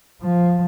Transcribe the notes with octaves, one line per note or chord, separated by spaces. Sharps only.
F3